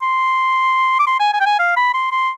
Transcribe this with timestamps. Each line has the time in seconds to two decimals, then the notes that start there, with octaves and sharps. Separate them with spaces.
0.02 C6
0.99 D6
1.07 C6
1.20 G#5
1.33 G#5
1.40 G5
1.46 G#5
1.59 F5
1.77 B5
1.94 C6
2.12 C6